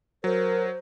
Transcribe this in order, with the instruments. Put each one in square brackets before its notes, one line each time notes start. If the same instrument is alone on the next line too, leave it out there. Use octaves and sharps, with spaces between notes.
[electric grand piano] F#3 [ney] A#4 [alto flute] C5